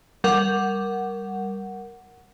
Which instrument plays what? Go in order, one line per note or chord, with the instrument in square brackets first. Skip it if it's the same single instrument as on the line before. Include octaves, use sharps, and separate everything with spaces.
[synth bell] G3 A#4 F#5